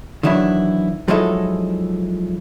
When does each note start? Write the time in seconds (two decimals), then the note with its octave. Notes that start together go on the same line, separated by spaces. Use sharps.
0.23 D#3 E3 F#3 D4 E4
1.08 F3 F#3 G#3 D#4 E4 A4